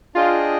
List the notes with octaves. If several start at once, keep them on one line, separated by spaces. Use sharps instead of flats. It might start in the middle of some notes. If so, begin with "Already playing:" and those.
D4 F4 G#4 D#5 G5